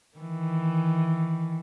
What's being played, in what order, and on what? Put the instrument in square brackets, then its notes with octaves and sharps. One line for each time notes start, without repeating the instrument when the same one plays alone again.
[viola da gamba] D#3 E3